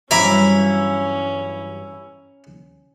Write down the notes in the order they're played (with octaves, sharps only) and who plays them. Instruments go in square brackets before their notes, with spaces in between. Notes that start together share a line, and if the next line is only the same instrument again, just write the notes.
[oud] G2 E3 F#3 [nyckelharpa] C#4 [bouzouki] E4 [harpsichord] A#5 B5 D6